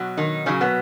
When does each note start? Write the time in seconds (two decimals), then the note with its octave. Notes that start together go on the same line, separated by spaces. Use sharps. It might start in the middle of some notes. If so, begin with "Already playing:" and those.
Already playing: B2 F#3
0.17 D#3 D#4
0.46 A#2 C#3 F#3 C#4
0.61 B2 B3